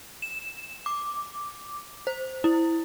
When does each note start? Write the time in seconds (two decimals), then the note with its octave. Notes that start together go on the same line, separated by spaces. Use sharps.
0.22 E7
0.86 D6
2.07 C5
2.44 E4